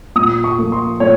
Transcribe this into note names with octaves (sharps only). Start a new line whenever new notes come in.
A#2 D#6
C#6
F3 A#3
C6
A#2 C#5